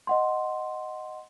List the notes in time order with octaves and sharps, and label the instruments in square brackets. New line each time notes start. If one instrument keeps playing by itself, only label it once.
[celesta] D#5 F#5 C6